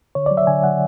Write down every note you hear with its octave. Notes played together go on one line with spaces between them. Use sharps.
D3 C#5
F#3 D5
E5
D3 G#5
F#3 F#5